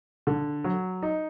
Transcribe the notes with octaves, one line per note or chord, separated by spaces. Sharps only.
D3
F#3
D#4